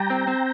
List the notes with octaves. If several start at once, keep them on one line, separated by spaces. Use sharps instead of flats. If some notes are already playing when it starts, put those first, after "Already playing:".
Already playing: G3 G5 A#5
C4
C4